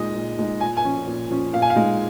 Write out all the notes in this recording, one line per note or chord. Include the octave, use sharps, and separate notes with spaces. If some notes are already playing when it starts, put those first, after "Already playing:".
Already playing: A#2 G#3 D#4 D#5
A#2
G#3 D#4
A#2 G#5
G#5
F3 C#4
A#2
F3 C#4
A#2 F5
G#5
F5
G#3 D#4